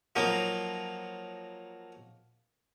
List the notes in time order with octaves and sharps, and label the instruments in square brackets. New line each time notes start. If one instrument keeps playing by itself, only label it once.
[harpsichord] F3 F#3 A#3 D#4